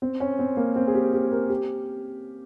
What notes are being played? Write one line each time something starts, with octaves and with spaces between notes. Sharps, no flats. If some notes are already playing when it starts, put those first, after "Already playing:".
C4
C#4
C4
A#3
C4
G#4
G4
G4
A#4
G4